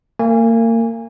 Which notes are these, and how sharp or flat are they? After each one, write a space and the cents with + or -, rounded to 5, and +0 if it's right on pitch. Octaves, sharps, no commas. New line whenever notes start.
A#3 -35 G#5 -20